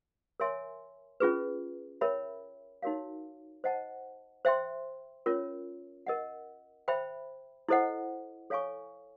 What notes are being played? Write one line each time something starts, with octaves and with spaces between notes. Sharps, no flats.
A#4 C#5 E5 G#5 C6
C#4 F4 G#4 B4
A#4 C#5 E5 G5 B5
D#4 F#4 A#4 C#5 F5
C5 D#5 F#5 A5
C5 E5 G5 C6
C#4 F4 A#4 C#5
A#4 D#5 F#5
C5 E5 G5 B5
E4 A4 C5 D#5 F#5
A4 C#5 F5 G#5 C#6